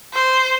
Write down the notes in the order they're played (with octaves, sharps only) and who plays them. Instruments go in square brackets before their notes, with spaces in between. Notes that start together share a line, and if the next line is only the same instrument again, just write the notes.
[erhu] C5